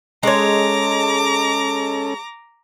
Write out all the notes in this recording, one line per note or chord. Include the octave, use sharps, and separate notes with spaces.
G#3 C#4 A4 C#5 A#5 D6